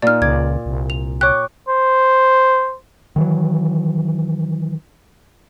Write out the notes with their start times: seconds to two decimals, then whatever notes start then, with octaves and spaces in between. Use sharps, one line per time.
0.02 A#2 D#4 D5 F6
0.22 C#2 D5 G#6
0.66 C2
0.90 F7
1.21 C#5 G5 C#6 D6 F#6
1.69 C5
3.16 D#3 E3 F#3